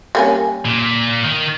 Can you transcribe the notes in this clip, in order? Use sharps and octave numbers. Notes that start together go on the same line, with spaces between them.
G3 A#3 C#4
A#2
D#3